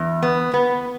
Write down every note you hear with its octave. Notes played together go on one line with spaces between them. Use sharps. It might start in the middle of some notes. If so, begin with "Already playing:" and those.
Already playing: E2
B3
B3